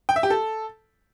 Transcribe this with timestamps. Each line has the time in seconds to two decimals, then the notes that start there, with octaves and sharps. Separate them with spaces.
0.09 G5
0.16 E5
0.23 G4
0.30 A4